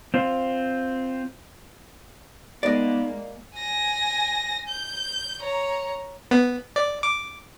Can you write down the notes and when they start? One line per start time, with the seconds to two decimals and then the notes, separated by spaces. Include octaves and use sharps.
0.14 C4 F4
2.63 G#3 A#3 B3 D#4 D5 D#5
3.56 G#5 A#6
4.68 G6
5.39 C#5 A#5
6.31 B3
6.76 D5
7.03 D6